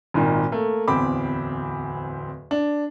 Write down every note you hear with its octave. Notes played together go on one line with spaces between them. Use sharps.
G#1 A#2 D#3
A3 A#3
D1 E2 C4 B5 D6
D4